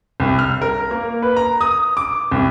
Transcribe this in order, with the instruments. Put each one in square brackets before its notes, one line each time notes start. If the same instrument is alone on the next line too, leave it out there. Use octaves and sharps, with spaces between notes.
[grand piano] C2
F6
A#4
A#3
B4
A#5
D#6
D6
C2